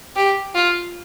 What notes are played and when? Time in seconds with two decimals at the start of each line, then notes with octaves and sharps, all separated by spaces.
0.16 G4
0.55 F4